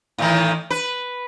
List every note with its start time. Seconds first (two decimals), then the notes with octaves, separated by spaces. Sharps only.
0.18 A2 D#3 E3
0.70 B4